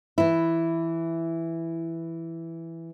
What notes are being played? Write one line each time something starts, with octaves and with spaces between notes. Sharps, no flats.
E3 E4